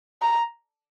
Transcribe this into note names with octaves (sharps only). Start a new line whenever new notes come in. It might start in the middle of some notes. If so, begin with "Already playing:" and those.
A#5